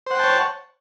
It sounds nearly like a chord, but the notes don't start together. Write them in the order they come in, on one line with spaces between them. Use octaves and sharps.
C5 F#5 G5 A5 C#5